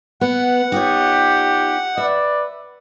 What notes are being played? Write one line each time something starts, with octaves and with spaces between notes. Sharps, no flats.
B3 F#5
D#4 F4 G4 C#5
B4 D5 E5